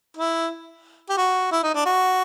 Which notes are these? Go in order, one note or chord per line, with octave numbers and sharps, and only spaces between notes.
E4
G4
F#4
E4
D#4
D4
F#4